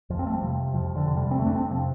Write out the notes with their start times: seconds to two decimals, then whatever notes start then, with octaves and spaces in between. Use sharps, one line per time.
0.10 F2 F3
0.19 C4
0.27 A3
0.34 G3
0.42 C3 F3
0.74 F2 F3
0.96 D3
1.06 C3
1.17 G3
1.31 C4
1.39 F2 A3
1.46 D4
1.56 C4
1.70 C3 F3